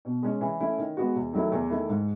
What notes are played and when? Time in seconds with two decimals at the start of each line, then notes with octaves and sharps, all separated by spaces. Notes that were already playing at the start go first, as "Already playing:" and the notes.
0.05 B2
0.23 G#3 C#4
0.41 E3
0.60 A3 C#4 E4
0.78 D#3
0.97 G#3 B3 F#4
1.16 E2
1.33 D#3 F#3 A3 E4
1.52 E2
1.70 D#3 A3 E4
1.89 G#2